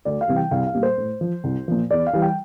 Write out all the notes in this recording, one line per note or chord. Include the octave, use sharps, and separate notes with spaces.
D2 D5
F5
C3 E3 G3
G5
C2 F5
F5
A#2 G3
C5
A2
F3
C2
A#2 F3
E2 D5
F5
E3 G3
G5